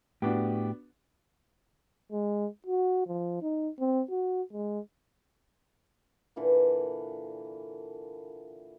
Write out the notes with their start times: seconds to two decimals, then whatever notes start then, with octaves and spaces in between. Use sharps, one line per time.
0.22 A2 B3 D4 F#4 G4
2.12 G#3
2.67 F#4
3.07 F3
3.42 D#4
3.80 C4
4.10 F#4
4.53 G#3
6.36 A#2 D3 E3 B4